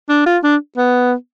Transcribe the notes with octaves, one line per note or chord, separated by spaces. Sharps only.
D4
F4
D4
B3